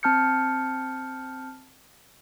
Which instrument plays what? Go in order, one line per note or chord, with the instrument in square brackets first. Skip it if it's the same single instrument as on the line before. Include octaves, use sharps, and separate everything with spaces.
[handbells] C4 A5 F6 G6 C#7